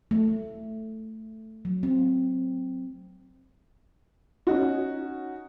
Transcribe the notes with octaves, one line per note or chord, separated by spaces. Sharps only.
A3
F#3
C4
C#4 D#4 F#4